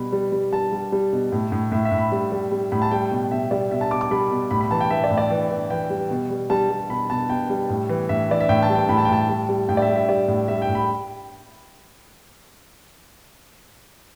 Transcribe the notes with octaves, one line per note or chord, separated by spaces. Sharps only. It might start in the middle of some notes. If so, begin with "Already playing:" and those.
Already playing: B2 G3 B5
G3
G3
G3 A5
G3
G3
B2
A2
A2
A2 E5
E5
A2
B5
G3
G3
G3
A2 B5
A5
G3 G5
B2
B2 E5
G3 D5
B2 E5
A5
B2 D6
D6
G3 B5
B2
A2 B5
B5
E3 A5
G5
E3 E5
D5
A2
D5
E3
E3
E3 G5
G3
B2
G3
G3 A5
G3
B2 B5
B2 A5
B2 G5
G3
A2
E3
A2 E5
E3 D5
E5
A2 G5
A5
G3
G5
A2 B5
A5
G5
A2 A5
G3
G3
A2 G5
D5
E5
G3
E5
G3 D5
A2
G3 E5
G5
A2
B5